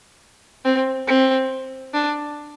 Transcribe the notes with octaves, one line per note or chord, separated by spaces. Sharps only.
C4
C4
D4